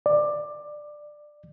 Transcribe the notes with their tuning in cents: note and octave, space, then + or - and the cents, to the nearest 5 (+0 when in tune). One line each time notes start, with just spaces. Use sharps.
D5 +15